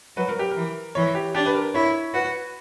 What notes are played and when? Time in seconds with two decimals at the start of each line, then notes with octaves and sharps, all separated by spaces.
0.17 F#3 B4
0.29 A#4
0.39 G4
0.51 E3 A#4
0.95 E3 C#5
1.15 G4
1.35 D4 G4
1.46 B4
1.55 A#4
1.74 E4 C#5
2.14 F#4 B4